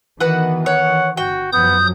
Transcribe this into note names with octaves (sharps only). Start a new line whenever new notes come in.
D#3 E3 B3 F#4 B4 F#5
C#5 F#5
G1 F#4 G5
F#2 F3 F#3 B3 D#6 G6